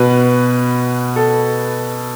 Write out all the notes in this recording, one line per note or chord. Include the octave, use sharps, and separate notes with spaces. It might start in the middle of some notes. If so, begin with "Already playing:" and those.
Already playing: B2 B4
A4